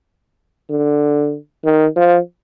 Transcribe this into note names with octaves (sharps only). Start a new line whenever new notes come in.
D3
D#3
F3